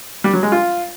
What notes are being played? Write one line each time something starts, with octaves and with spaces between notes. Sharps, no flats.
G3
F#3
G#3
F4